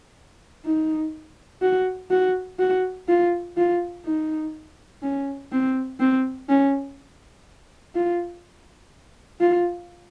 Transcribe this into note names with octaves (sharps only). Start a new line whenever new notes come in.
D#4
F#4
F#4
F#4
F4
F4
D#4
C#4
C4
C4
C#4
F4
F4